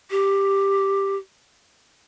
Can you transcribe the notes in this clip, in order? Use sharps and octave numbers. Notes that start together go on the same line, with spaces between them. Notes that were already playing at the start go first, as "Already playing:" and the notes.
G4